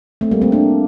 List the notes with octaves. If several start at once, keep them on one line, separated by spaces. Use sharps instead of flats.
A3 C4
G3 A#3
A3 C4
A#3 D4